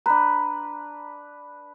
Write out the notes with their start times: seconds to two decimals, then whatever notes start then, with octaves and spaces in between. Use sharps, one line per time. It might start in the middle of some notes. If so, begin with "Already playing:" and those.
0.06 D4 B4 A#5